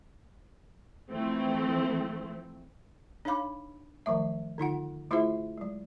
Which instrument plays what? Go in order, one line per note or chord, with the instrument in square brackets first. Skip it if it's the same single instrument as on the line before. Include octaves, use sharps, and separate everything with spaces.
[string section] E3 F3 A3 C4
[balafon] D4 D#4 C#5 F5 B5 D6
D#3 F3 F#3 A3 E5
D3 D#4 F4 F#5
A3 E4 F4 G#4 C5 E5
F#3 G#3